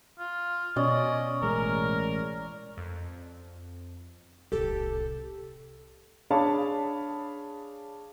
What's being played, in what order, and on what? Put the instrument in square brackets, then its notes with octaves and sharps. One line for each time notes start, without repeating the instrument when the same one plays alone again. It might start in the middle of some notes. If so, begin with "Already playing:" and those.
[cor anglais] F4
[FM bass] B2 [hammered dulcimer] C#4 D5 [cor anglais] D#5
[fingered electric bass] A1 G#3 [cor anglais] A#4
[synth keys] F2
[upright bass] D1 C2 [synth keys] G4 A4
[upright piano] D4 G#4 C#5 F5 A5 B5